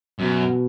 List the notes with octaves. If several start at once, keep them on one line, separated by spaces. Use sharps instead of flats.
F#2 B2